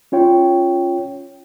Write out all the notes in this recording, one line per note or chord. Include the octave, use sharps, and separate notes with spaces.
C#4 F4 C#5 G5